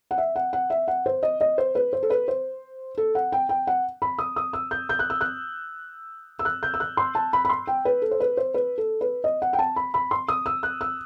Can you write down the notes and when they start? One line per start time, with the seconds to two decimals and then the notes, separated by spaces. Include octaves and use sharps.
0.11 F#5
0.18 E5
0.36 F#5
0.53 F#5
0.70 E5
0.88 F#5
1.06 C5
1.23 D#5
1.41 D#5
1.58 C5
1.75 B4
1.93 C5
2.03 A4
2.10 B4
2.28 C5
2.98 A4
3.15 F#5
3.32 G5
3.49 G5
3.67 F#5
4.02 B5
4.19 D#6
4.36 D#6
4.53 E6
4.71 G6
4.89 G6
4.99 F#6
5.10 E6
5.21 F#6
6.39 E6
6.45 F#6
6.63 G6
6.74 E6
6.80 F#6
6.97 C6
7.15 A5
7.33 B5
7.45 B5
7.49 C6
7.67 G5
7.85 B4
8.02 A4
8.11 C5
8.20 B4
8.37 C5
8.54 B4
8.78 A4
9.01 B4
9.24 D#5
9.42 F#5
9.53 G5
9.59 A5
9.76 B5
9.94 B5
10.11 C6
10.28 D#6
10.46 E6
10.63 F#6
10.81 E6